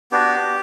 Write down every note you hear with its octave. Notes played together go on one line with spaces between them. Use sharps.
B3 D4 F#4 G4